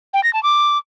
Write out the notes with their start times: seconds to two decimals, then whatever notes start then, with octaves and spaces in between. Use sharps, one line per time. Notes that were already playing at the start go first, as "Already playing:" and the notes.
0.14 G5
0.23 A#6
0.33 A5
0.43 D6